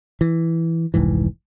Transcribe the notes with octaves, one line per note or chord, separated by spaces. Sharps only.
E3
F1 C2 G#2 E3